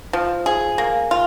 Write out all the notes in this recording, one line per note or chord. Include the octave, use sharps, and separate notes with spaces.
F3
G#4
A#3
F4